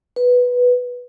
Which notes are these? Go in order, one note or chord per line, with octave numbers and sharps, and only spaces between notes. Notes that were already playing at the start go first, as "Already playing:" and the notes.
B4